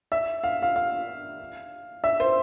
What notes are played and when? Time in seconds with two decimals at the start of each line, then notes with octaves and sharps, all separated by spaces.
0.12 E5
0.44 F5
0.62 F5
0.76 F5
2.04 E5
2.20 C5